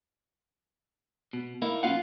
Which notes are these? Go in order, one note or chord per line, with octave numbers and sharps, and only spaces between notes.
B2
A#3 D#4 E4
B1 C#4 D4 F4 F5 F#5